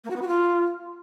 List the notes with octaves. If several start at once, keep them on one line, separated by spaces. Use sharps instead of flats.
A#3
F#4
B3
F#4
F4